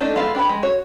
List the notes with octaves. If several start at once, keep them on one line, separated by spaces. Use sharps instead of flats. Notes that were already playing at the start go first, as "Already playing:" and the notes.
A3 D4 D#4 A4
G#3 B3 F4 A4 F5
D4 G4 B4 B5
G#3
F#4 C#5